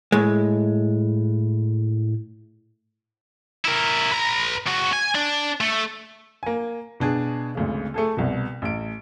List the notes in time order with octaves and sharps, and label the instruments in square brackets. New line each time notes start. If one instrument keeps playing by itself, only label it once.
[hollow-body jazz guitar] A2 G#3
[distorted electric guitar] E4 A#4
B4 A#5
C#3 F#4
G#5
D4
A3
[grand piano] A#3 G#5
B2 D4 G#4
G#1 D2 C#3
A3 G#4 A4
C2 B2
A1 D7